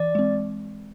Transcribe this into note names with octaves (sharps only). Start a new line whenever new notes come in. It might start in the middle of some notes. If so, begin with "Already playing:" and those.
Already playing: E3 D5
G#3 C4